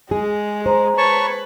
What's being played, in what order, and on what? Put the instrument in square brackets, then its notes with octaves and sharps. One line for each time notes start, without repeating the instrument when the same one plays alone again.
[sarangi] G#3 [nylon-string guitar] G#4
[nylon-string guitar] C5 [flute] A#5
[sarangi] B4 [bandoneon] C#5 A5 C#6